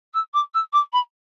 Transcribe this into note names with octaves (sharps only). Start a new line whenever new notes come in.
E6
D6
E6
D6
B5